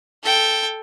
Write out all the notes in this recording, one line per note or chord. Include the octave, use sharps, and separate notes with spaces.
A4 G5